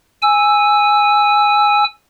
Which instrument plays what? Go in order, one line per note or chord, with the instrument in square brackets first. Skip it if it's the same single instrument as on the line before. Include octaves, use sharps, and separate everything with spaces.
[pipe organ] G#5 E6